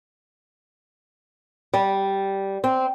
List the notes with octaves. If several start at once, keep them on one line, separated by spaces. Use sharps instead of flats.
G3
C4